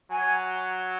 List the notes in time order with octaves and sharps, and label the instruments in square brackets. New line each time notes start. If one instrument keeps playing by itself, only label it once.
[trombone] F#3 [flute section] G#5